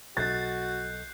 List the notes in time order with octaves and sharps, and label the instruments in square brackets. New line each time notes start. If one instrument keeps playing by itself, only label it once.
[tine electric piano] B1 A4 D#5 [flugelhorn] F#4 [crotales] F#6 G6 C7 [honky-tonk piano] A6